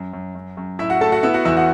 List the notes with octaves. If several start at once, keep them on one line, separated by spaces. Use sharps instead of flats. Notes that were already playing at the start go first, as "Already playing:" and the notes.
Already playing: F#2
F#2
F#2
F#2
A2 E4 E5
F#4 F#5
A3 A4 A5
F#4 F#5
B3 E4 E5
F#4 F#5
E2 E4 E5
F#4 F#5